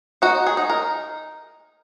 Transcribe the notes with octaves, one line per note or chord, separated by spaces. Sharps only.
D#4 F#4
G#4
D#4
A#4